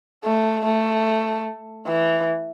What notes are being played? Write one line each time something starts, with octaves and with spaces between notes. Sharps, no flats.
A3
A3
E3